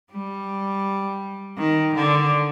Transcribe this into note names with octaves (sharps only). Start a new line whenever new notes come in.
G3
D#3
D3